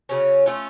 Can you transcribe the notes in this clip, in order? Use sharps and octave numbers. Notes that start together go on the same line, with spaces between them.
C#3 F#3 C#4
A3 C#4 F4